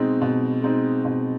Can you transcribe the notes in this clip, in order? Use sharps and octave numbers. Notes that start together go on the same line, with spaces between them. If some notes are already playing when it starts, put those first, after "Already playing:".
Already playing: B2 G#3 C4 D#4
B2
G#3 C4 D#4
B2